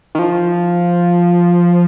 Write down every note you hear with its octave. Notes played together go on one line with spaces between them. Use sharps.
D#3
F3